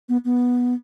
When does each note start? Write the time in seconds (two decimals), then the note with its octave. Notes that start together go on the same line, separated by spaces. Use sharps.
0.09 B3
0.25 B3